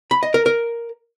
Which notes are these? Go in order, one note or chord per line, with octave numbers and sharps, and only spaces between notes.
B5
D#5
A#4
A#4